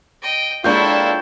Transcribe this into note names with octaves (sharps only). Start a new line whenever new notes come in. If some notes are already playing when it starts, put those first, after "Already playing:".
D#5 G5
G#3 A#3 D4 E4 F4 A4 C#5 G5